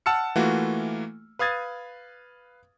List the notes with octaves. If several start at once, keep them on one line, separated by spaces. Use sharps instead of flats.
F#5 A5 E6 F6 C#7
E3 A3 A#3 F4 F#4
B4 F5 D#6 G#6 A6